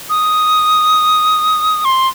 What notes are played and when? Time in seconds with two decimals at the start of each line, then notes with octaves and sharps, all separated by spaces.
0.09 D#6
1.85 C6